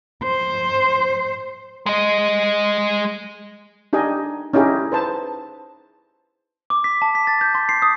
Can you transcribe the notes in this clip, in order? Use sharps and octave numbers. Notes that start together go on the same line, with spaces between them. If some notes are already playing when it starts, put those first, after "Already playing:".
C5
G#3 D#5
D4 D#4 G4 D#5 G#5
C#4 D#4 E4 G4 G#4
B4 C5 A5
D6
B6
A5
B6
A6
G6
C6
C7
D#6